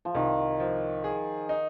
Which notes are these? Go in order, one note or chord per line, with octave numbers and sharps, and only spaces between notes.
F3
C2 D#3
F3
G#4
D#4